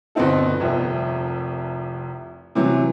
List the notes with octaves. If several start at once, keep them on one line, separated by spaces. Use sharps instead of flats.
G1 B2 B3 C4 D#4 A4
F1 C2
C3 E3 F#3